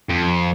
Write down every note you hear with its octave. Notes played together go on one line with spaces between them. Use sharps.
F2